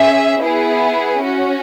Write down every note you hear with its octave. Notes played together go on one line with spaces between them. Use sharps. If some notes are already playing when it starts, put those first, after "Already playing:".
Already playing: C#4 G#4 E5
B3 E4 G#4
C#4 F#4